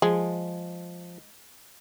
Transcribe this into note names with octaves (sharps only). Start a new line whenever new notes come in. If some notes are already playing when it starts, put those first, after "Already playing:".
F3 G#3